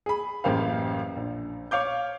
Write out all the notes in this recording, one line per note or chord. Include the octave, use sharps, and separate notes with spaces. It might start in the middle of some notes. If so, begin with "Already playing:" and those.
G#4 B5
A1 F#2 A#3 G4 C5 F5
A#1
C#5 F5 D6 G6